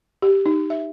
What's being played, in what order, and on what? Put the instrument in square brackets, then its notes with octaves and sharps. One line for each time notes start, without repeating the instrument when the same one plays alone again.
[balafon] G4
D#4
E5